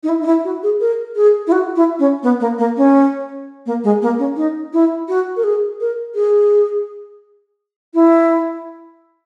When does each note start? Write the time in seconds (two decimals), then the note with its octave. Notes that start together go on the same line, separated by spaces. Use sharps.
0.03 D#4
0.09 E4
0.21 D#4
0.26 E4
0.45 F#4
0.63 G#4
0.81 A#4
1.16 G#4
1.47 E4
1.52 F#4
1.76 E4
1.99 C#4
2.23 B3
2.40 A#3
2.59 A#3
2.77 C#4
3.66 A#3
3.84 G#3
4.02 A#3
4.19 C#4
4.37 D#4
4.73 E4
5.08 F#4
5.36 A#4
5.44 G#4
5.80 A#4
6.15 G#4
7.94 E4